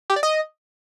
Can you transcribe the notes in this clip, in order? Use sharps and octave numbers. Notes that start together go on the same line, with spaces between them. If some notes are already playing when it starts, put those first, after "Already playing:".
G4
D5
D#5